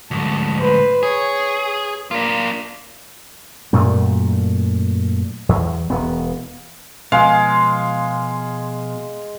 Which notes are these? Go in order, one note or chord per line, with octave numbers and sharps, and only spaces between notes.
D2 G#2 A5
B4 C5
G#4 C#5
A#3 D4 F4
F#2 A#2 A3
E2
E1 B3
B2 F3 G#3 B3 F5